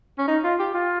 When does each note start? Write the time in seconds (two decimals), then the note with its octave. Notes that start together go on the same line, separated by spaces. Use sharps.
0.18 C#4
0.28 D#4
0.44 F4
0.59 G4
0.74 F4